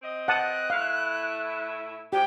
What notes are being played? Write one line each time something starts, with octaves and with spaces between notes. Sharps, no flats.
C4 D#5
F#5 A5 D#6 F#6
A2 E4 F5
G#2 F3 G#3 G4 G5